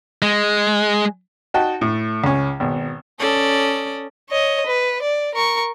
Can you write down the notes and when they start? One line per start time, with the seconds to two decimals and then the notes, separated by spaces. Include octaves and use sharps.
0.22 G#3
1.54 D#4 F#4 G5 A5
1.81 A2 A3
2.24 C#2 C#4
2.60 G#1 B2
3.20 C#4 A4 D5 D#6
4.30 C#5 D#5
4.67 B4
5.02 D5
5.35 A#4 C#6